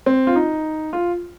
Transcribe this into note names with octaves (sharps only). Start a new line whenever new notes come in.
C4
F4
D#4
F4